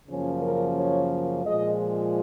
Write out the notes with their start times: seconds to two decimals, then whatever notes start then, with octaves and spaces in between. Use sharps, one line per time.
0.08 F#2 C#3 F3 A#3 C#4
0.42 A#4
0.77 C#5
1.44 A#2 F3 G#3 D#5